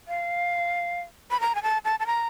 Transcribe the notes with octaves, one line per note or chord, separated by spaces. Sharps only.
F5
B5
A#5
G#5
A5
A5
A5
A#5